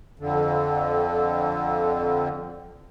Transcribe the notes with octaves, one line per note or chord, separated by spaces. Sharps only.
F2 D3